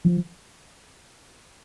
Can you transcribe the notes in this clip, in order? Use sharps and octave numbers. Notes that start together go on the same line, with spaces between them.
F3